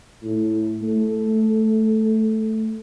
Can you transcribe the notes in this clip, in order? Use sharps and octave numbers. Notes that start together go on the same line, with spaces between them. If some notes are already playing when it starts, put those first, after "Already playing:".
A2
A3